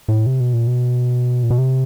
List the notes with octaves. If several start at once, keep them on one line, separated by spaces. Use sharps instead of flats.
A2
C3
B2
A#2
B2
A#2
B2
C3